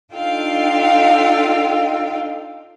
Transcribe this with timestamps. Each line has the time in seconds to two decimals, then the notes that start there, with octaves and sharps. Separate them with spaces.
0.13 D4 D#4 F4 A4 F5 G5